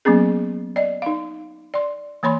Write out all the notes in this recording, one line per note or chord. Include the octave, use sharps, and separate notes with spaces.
F#3 A#3 B3 C#4 G#4
D5 D#5
D#4 F5
D5 C6
E3 A#3 C#5 B5 C6